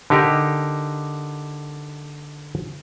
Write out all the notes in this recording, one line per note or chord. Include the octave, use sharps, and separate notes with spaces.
D3 D#4 G4 A#4